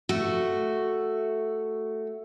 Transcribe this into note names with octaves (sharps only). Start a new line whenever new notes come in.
A3 F#4